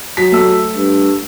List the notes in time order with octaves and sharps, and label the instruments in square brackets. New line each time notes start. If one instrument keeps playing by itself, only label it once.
[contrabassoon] F#3 [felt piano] B6
[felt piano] A3 E6
[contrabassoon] G2